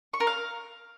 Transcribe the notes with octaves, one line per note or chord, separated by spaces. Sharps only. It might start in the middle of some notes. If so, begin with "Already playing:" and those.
C#6
A#4
F5